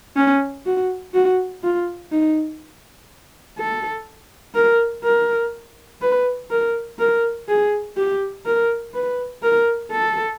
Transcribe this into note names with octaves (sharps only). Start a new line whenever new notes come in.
C#4
F#4
F#4
F4
D#4
A4
A#4
A#4
B4
A#4
A#4
G#4
G4
A#4
B4
A#4
A4